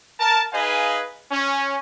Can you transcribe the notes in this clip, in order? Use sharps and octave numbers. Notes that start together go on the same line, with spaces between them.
A#4 A5
D#4 G#4 B4 D#5 F5 G#5
C#4